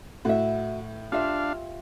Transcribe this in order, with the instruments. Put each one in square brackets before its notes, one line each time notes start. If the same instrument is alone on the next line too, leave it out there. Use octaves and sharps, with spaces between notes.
[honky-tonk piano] A2 [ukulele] F#4 E5
[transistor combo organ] D4 F5 [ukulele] F4 G4 E5